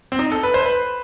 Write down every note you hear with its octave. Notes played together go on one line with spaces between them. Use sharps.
C4
D#4
A4
B4
C5
B4